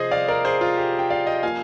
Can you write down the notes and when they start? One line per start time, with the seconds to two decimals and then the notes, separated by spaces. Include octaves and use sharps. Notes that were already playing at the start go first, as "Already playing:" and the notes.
Already playing: C3 F3 G#4 C5 D#5
0.11 D5 F5
0.28 A#4 D5
0.45 G#4 C5
0.61 F4
0.77 G4
0.99 G5
1.10 D5 F5
1.27 D#5 G5
1.43 F3 A#3 F5 G#5